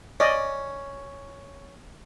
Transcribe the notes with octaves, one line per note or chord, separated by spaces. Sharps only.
C#4 D5 D#5